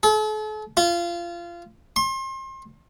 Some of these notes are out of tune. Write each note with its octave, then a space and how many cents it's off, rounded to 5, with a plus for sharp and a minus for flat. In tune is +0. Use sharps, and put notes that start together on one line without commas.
A4 -45
F4 -20
C6 +35